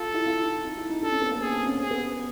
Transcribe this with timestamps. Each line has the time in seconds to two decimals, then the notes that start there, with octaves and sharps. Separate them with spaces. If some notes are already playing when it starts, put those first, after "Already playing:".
Already playing: F4 A4
0.14 E4
0.26 F4
0.39 D#4
0.65 D#4
0.77 E4
0.89 D#4
1.03 D4 A4
1.12 C#4
1.22 B3
1.31 A#3
1.40 B3 G#4
1.53 C4
1.66 C#4
1.79 C4 G#4
1.91 B3
2.04 B3